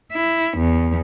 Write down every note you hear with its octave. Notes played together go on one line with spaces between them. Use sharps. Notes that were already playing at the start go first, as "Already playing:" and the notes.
E4
E2